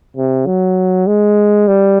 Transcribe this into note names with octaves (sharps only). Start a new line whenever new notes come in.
C3
F#3
G#3
G3